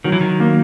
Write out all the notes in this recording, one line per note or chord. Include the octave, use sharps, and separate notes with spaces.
D#3 F#3
E3
D#3
A#3